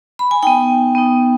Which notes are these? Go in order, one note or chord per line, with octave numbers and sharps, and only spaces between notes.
B5
G#5
B3 D#4 G5
B3 D#4